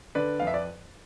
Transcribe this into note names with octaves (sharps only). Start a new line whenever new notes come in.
D3 B4 D5
F2 F5
E5
D5